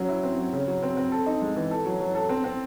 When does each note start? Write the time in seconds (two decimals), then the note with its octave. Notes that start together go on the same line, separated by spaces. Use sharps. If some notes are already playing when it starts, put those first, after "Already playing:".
Already playing: F#3 C#4
0.09 E4
0.23 C4
0.38 F#3
0.53 C#3
0.67 F#3
0.83 C4
0.97 C4
1.12 A4
1.26 D#4
1.42 G#3
1.56 E3
1.71 A4
1.86 F#3
2.00 F#3
2.15 A4
2.29 C4
2.44 C4